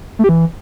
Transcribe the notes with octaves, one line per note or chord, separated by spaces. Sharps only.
A3
G4
E3